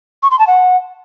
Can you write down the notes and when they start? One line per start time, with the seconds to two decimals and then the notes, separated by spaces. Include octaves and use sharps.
0.23 C#6
0.31 C6
0.39 A5
0.47 F#5